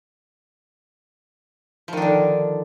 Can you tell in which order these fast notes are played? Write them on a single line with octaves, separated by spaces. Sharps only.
F3 D#3 D4 D3